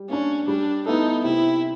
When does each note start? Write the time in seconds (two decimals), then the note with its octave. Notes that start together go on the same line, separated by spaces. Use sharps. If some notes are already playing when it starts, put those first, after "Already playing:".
Already playing: G3
0.10 A#3 C#4 D4
0.47 G3 D4
0.86 B3 D#4 E4 A4
1.24 C3 E4